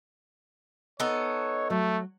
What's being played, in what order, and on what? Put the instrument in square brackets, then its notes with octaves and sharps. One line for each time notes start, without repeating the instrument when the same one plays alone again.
[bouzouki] B3 D#4 A4 [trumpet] C#5
[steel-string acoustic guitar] F#3 [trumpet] A3